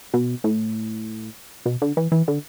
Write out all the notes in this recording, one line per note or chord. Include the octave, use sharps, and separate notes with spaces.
B2
A2
B2
D3
E3
E3
D3